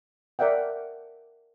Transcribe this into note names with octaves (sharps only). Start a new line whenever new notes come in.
A#4 D5 E5 F#5 G5